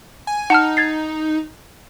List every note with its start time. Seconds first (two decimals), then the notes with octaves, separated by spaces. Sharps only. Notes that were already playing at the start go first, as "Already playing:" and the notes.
0.27 G#5
0.50 D#4 F#5 A5 F6
0.77 G#6 A6 C7